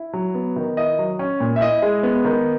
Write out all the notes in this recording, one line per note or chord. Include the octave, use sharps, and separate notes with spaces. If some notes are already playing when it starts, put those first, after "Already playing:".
Already playing: E4
F#3
B3
D#3
E4 D#5
F#3
C#4
A#2
E5
E4 D#5
G#3
B3
D#3